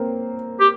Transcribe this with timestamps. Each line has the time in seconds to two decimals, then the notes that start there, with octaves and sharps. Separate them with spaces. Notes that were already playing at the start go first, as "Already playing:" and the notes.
Already playing: A#3 C4
0.60 G4